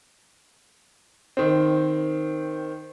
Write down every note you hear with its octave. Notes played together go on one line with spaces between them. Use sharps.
D#3 C4